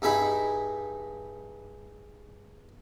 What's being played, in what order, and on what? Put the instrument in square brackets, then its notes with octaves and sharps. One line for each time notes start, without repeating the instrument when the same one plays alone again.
[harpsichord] G2 D#4 E4 G#4 B5